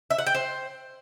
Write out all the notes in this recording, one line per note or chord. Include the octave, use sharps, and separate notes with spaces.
E5
F#5
G5
C5